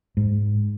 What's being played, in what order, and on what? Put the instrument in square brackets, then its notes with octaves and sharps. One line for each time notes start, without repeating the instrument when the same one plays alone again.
[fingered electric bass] G#2